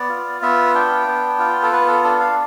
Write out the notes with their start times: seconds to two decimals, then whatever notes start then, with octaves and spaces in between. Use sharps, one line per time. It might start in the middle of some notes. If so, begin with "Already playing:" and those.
Already playing: B3 D5
0.09 F4
0.42 B3 E5
0.75 D4 G5
1.08 B3
1.39 F4
1.63 A4
1.73 B3 B4
1.88 A4
2.04 D4 A4
2.21 F5